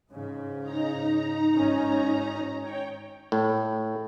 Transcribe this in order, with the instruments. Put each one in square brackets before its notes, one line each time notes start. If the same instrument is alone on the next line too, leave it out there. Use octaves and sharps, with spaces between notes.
[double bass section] G#2 C#3
[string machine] D#4 A#5
[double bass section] G#1 C#4
[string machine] C#5 G5
[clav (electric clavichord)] A2